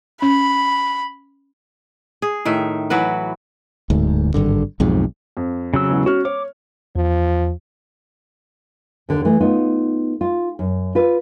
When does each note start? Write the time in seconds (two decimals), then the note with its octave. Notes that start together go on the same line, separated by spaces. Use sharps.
0.22 C#4 B5
2.22 G#4
2.45 A2 D#3 E5
2.90 E3 F#3 F#4 B4
3.90 D1 D2 G#2
4.34 G#1 G2 D3
4.80 B1 F2 G#2
5.37 F2
5.74 C#3 F#3 E6
5.89 E1 E3 F#4
6.06 C#4 F#4 F6
6.25 C#5 D6
6.96 E2 F3
9.09 D#2 D3
9.25 E3 A3
9.41 B3 D#4 F4
10.21 F4
10.59 F#2
10.95 F4 B4